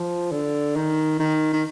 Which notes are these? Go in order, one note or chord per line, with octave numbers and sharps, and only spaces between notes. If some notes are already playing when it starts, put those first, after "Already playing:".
Already playing: F3
D3
D#3
D#3
D#3